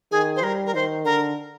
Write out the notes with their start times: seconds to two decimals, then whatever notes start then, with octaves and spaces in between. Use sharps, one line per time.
0.11 D#3 G#4
0.36 C5
0.43 G3 A#4
0.66 A#4
0.74 D#3 C5
1.05 D3 A#4